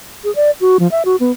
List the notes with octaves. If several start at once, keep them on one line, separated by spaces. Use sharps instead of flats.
G#4
D5
F#4
F3
E5
F#4
B3